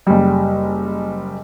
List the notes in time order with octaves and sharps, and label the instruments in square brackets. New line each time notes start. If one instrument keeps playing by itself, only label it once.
[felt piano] F#1 G3